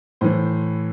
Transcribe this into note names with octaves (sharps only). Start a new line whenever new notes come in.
A2 E3 C5